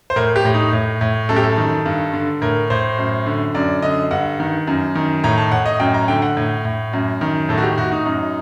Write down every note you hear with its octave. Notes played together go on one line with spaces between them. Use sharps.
C5
A2 A#4
G4
A2
D#4
A2
A2
F#2 A4
G4
A4
D#3
G2
D3
A2 A#4
A2 C5
F#2
D3
F#2 D5
D3 D#5
G2 F#5
D#3
F#2
D#3
A2 A#5
A5
A2 F#5
D#5
F#2 G5
A#5
D3 G5
F#5
A2
A2
F#2
D#3
A2 A4
F#4
G4
A2 F#4
D#4
F#2